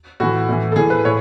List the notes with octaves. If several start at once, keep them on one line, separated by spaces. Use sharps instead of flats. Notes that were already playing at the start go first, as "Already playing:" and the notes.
A2 E3 F#4
A2 E3
A4
A2 E3 G#4
B4
A2 C#5